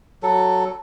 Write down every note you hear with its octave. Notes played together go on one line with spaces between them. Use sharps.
F#3 A4